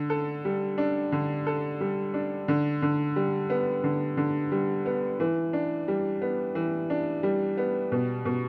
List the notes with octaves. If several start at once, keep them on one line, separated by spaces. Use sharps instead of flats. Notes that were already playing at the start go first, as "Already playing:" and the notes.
Already playing: D3
A4
G3
D4
D3
A4
G3
D4
D3
D3
G3
B3
D3
D3
G3
B3
E3
D4
G3
B3
E3
D4
G3
B3
B2
B2